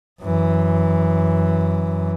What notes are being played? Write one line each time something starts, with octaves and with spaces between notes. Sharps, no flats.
F#2 E3